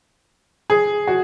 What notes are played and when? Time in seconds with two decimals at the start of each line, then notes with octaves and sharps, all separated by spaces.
0.70 G#4
1.07 F#4